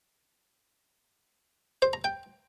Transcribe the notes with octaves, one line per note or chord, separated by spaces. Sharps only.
C5
A#5
G5